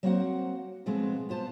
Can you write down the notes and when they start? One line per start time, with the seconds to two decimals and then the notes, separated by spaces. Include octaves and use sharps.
0.03 F#3 A#3 C4 F#4 C5 F#5
0.86 B2 F3 G#3 A3 B3 C4
1.29 B3 F4 C5 A5